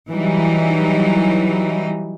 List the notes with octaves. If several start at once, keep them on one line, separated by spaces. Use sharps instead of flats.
E3 F#3 G3 D#4